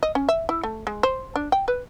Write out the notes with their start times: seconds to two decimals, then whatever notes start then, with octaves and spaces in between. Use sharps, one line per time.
0.03 D#5
0.15 C#4
0.29 E5
0.49 E4
0.63 A3
0.87 G#3
1.03 C5
1.36 D4
1.52 G5
1.68 B4